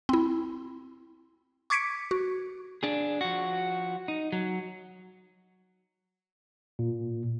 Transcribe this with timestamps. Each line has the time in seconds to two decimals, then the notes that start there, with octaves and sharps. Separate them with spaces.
0.09 C4 E4
1.70 C#6 D6 G#6 B6 C#7 D7
2.11 F#4
2.83 D4 G#4
3.21 F3 F#4
4.08 D#4
4.32 F#3
6.79 A#2